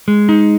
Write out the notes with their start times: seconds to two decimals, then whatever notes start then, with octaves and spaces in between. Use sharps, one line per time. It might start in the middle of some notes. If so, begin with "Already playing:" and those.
0.08 G#3
0.29 D#4